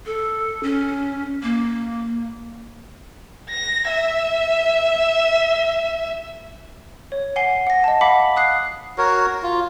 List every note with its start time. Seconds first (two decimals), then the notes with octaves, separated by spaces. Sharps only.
0.06 A4
0.63 C#4
1.43 A#3
3.49 A#6
3.87 E5
7.12 C#5
7.36 F#5 G#5 C7 G7
7.67 F#5 A#6
7.84 D#5 A5
8.01 F5 F#5 B5 D6 B6
8.36 D#6 F#6 C7
8.98 F#4 A#4 C#5
9.43 F4